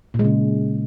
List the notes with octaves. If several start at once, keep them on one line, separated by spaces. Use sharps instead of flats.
A#2
G#3
C#3